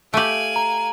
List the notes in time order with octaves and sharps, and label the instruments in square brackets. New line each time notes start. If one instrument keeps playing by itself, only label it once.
[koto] A3 G4 [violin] F5 G#5 [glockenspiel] D7 F#7
[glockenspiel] A#5